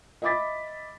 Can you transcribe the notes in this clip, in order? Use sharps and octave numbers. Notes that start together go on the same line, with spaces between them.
D#5 E5 B5 D6 A6 B6